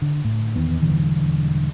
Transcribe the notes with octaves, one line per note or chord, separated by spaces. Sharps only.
D3
A2
E2 D#3 B3
E1 G2 D3 E3